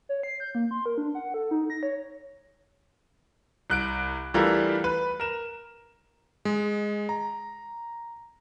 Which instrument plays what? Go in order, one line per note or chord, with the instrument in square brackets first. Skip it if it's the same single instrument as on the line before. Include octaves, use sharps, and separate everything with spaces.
[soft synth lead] C#5
C7
G6
A#3
C6
A#4
D4
F#5
A4
D#4
A#6
C#5
[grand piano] C2 F#6 D7
E3 G3 A3 D4 F4 A#4
B4
A#4 E7
[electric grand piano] G#3
A#5